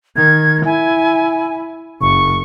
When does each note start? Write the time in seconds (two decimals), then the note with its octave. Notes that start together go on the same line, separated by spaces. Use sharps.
0.16 D#3 G#6
0.66 E4 G#5
2.01 F#1 C#6